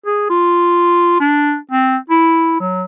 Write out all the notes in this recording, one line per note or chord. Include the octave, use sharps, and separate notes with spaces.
G#4
F4
D4
C4
E4
F#3